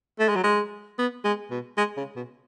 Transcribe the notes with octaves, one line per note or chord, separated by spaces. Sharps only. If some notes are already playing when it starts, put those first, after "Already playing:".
A3
G#3
F#3
G#3
B3
G#3
B2
G#3
C#3
B2